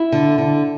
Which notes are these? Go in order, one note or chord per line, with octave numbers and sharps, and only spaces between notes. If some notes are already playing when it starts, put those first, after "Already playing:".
Already playing: E4
D3
D3